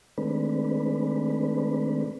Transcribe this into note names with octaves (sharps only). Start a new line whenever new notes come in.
D#3 G#3 A3 C4 D4 B4